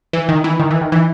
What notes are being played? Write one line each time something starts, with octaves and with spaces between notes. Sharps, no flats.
E3
D#3
E3
D#3
E3
D#3
E3